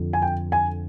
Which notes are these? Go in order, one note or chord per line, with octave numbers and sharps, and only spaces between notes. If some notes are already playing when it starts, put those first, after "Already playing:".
Already playing: F2 D3
G#5
G5
G#5